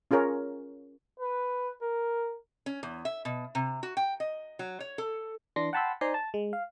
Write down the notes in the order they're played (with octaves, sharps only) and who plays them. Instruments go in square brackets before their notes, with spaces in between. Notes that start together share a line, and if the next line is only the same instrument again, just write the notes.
[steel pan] C#4 F4 G#4 A#4 C#5
[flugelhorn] B4
A#4
[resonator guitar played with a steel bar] C#4
E2
E5
B2
C3
F#4
G5
D#5
F#3
C#5
A4
[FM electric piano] E3 D4 C6 A#6
F#5 G5 A5 B5 C6 E6
D#4 C5 D5 G#5 A#5 C6
A5
G#3
F5